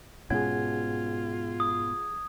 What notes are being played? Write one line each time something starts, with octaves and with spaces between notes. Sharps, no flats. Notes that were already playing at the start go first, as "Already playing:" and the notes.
G#2 B2 C#4 F4 G#4 F#5 G#6
D#6